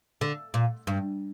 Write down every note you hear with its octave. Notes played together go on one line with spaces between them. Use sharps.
D3
A#2
G2